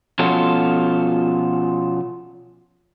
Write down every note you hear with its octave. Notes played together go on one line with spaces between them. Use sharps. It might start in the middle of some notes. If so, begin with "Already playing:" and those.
B2 F3 C#4 F4 F#4 A4